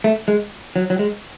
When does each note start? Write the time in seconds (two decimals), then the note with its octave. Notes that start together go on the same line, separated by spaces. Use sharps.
0.04 A3
0.28 G#3
0.76 F#3
0.90 F#3
0.99 G#3